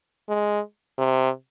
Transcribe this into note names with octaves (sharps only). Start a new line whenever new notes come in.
G#3
C3